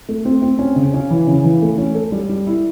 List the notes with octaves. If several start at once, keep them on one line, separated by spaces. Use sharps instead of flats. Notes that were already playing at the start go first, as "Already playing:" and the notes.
A3
C4
C4
C#4
C#3
C#4
E3
C#3
E3
A3
C#4
A4
G3
G3
E4